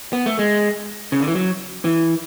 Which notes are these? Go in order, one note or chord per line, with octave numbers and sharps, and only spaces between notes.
B3
A3
G#3
C#3
D3
E3
F#3
E3